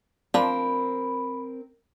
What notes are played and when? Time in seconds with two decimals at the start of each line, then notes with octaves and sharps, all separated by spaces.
0.34 F3 C4 D4 A#4 B5